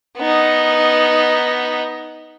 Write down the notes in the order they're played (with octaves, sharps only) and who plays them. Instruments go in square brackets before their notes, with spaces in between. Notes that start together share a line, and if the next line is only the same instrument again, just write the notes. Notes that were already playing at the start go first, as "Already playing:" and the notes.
[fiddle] B3 D#4